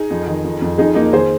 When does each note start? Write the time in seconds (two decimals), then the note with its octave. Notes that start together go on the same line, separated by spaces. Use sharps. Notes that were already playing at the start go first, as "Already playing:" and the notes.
Already playing: D#4 G#4
0.10 F2
0.27 D#3
0.44 F2
0.62 F2
0.78 F2 D#4 G#4
0.95 F2 A#3 D#4
1.12 D#3 G#4 C5